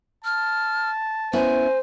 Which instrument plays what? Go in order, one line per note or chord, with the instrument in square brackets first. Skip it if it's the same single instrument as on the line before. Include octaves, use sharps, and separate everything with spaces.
[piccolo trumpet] A5 [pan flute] F6
[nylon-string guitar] B3 C#4 E4 [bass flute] C5 [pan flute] G#5